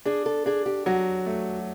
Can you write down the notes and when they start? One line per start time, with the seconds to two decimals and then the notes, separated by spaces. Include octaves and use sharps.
0.06 D4 G#4
0.26 A4
0.46 D4 G#4
0.66 G4
0.86 F#3 F#4
1.26 A3